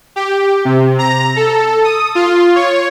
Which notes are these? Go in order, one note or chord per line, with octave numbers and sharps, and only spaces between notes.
G4
C3
A#5
A4
D#6
F4
C#5